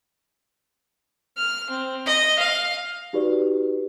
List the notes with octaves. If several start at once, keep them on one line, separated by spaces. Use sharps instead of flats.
F6
C4
D#5
F5
D#4 F#4 G4 B4 D5